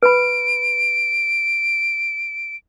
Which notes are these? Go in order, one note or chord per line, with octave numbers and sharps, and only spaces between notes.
B4 B5 D7